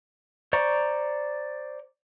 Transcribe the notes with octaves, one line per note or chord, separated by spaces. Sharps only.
C5 D5 A#5 C#6